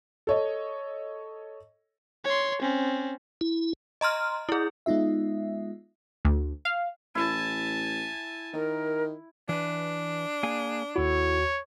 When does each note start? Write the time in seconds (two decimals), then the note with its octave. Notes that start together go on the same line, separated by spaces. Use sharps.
0.27 A4 C#5 D#5
2.25 C#5 C6
2.62 C4 C#4
3.41 E4
4.01 D#5 A#5 C6 F6
4.49 E4 G#4
4.86 G#3 B3 D#4 F4 E5
6.25 D2
6.65 F5
7.15 A1 E4 G#5 A5
8.53 D#3 A#4
9.49 E3 D4 B4
10.43 A#3 G#4 G#5
10.96 D#2 E4 F#4 A4 C#5